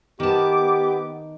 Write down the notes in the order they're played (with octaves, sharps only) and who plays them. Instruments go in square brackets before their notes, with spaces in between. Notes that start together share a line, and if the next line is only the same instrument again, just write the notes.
[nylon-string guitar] D#3 A5 [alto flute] B3 [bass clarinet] G4 [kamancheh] D6